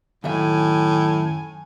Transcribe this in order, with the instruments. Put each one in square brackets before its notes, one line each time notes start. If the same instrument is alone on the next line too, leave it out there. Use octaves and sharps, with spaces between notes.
[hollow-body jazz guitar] F#2 D#3 E5 [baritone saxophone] A2 [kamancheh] G#5